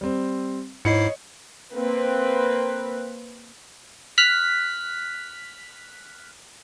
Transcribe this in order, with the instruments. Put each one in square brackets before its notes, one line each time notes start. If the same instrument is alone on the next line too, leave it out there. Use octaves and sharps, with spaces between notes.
[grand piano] G3 C4
[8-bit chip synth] G#2 E4 C7 [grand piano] C#5 D#5 C#7
[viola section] A#3 C4 B4
[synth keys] F6 F#6 B6